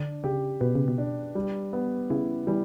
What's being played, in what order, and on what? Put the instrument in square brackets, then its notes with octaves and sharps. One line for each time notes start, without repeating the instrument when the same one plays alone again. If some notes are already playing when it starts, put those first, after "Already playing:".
Already playing: [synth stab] D3 [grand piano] D4
[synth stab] C#3 [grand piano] G4
[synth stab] B2 [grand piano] B4
[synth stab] C#3
B2
[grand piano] D4
G3
B3
[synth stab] C#3 [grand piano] E4
[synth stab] E3 [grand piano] G3